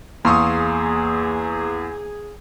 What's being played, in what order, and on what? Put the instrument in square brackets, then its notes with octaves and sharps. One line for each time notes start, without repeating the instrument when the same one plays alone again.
[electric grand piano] E2 [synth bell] A#3 F5 E6 [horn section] G#4 [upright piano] C6 C#6 D#6